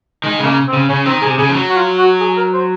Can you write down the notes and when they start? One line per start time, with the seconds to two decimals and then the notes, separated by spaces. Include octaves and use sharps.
0.24 D#3 G#3
0.37 C#3 G#3
0.45 A#3
0.68 C4
0.73 C#3
0.89 C#3 C#4
1.06 D#3 C4
1.22 C3 G#4
1.39 C#3 G#4
1.49 F3
1.54 F#3
1.70 F#4
1.76 F4
1.99 F#4
2.20 G#4
2.37 A#4
2.53 C5